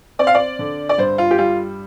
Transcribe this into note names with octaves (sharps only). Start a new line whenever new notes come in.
C4 D5
F5
D5
D3
D5
G2 C5
F4
G4
G3 F4